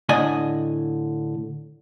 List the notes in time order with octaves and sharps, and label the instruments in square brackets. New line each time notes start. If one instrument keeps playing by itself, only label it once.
[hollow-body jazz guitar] A2 D3 D5 D#5 G#5